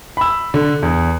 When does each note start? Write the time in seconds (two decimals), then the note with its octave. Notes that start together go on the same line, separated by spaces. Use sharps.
0.17 B5 E6
0.54 D3
0.83 E2